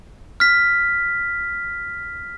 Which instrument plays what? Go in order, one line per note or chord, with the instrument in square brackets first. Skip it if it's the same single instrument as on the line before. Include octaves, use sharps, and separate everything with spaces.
[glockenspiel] F6 B6